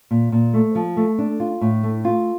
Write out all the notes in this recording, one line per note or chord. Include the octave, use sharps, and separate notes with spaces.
A#2
A#2
A3
F3
A3
D4
F4
A2
A3
F4